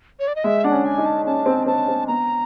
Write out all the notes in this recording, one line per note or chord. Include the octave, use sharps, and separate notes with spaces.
C#5
D5
D#5
G#3 E5
D4 F#5
C#4
G#5
D#4
A5
C#4 A5
C4
C4 A5
C4
B3 A#5